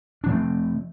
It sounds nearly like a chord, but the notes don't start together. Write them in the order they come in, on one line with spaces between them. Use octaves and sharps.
D4 F3 A3 C4